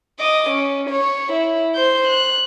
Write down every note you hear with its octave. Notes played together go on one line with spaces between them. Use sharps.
D#5 D6
C#4
C#5
E4
C5 G6
F#6